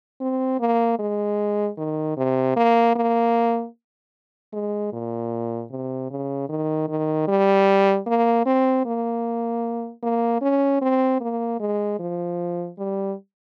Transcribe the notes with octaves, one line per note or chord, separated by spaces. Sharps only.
C4
A#3
G#3
D#3
C3
A#3
A#3
G#3
A#2
C3
C#3
D#3
D#3
G3
A#3
C4
A#3
A#3
C#4
C4
A#3
G#3
F3
G3